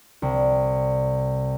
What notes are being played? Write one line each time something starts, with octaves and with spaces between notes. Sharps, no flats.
C2